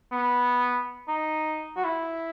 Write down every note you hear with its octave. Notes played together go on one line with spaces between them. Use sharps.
B3
D#4
F#4
E4